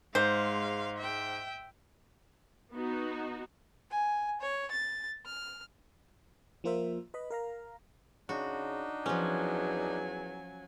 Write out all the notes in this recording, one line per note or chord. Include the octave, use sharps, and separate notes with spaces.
G#2 G#3 C5 F5
E5 G5
B3 D#4 F#4
G#5
C#5
A6
F6
F3 A#3 F4 A#4 C5 E5
B4 D#5 B5
A#4 F5 A#5
C#3 D4 D#4 F#4
E2 F3 F#3 C#4 G#5